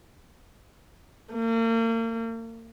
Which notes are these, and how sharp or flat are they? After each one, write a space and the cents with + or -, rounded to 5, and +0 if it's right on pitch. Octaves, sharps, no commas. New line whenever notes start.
A#3 -40